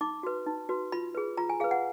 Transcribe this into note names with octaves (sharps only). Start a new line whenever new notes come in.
D#4 D6
F#4 B4
D#4
F#4 B4
F4 B5
G#4 B4
F4 A#5
G#5
G#4 B4 F5
F#5